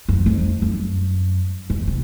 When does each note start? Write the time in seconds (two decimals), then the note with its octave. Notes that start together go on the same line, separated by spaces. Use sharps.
0.09 F#2
0.26 F2
0.62 F#2
1.70 G#2
1.87 C3